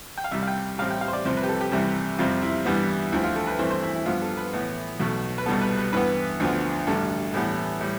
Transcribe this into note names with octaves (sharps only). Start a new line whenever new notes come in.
G5
F5
C2 C3 G3 E5
F5
G5
A1 A2 G3 C4 F5
G5
F5
C5
D5
C2 C3 F3 C4 C5
B4
G4
A4
G4
C2 C3 E3 G3
F2 C3 G3 C4 F4
E4
G2 E3 G3 B3
D2 D3 F3 E4
F4
A4
B4
G2 E3 A3 C4 C5
C5
E4
E4
G2 F3 B3 F4
A4
B4
A2 E3 B3
B1 B2 A3
B4
C2 B2 G3 B3 A4
B4
B4
G2 E3 B3 B4
D2 D3 F3 B3
A1 G2 D3 A4
A2 E3 G3 B3
A2 G3